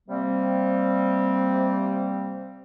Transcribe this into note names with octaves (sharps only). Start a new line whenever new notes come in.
C3 G3 A#3 C4